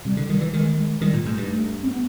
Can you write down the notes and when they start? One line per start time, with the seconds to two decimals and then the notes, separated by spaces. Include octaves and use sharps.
0.05 C3 G3
0.17 D3
0.29 D#3 G3
0.41 E3
0.53 D#3 G#3
0.77 G#3
1.01 D#3 G3
1.13 A#2
1.26 G#2 A3
1.37 G2
1.50 A3
1.82 C4
1.90 B3